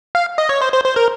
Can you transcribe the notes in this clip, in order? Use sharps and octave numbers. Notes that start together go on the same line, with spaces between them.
F5
D#5
C#5
C5
C5
C5
A#4